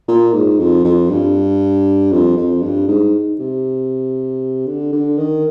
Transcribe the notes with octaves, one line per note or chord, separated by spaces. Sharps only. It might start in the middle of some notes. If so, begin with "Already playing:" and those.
A#2
G#2
F2
F2
G2
F2
F2
G2
G#2
C3
D3
D3
D#3